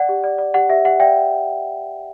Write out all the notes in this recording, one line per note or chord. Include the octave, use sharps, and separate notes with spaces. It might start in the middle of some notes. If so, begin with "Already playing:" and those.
Already playing: D5 F#5
G4
D5
D5
G4 F#5
G4 E5
G4 F#5
D5 E5 G5